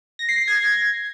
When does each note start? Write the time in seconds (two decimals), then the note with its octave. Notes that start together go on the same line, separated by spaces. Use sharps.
0.19 A#6
0.29 C7
0.38 A#6
0.48 G#6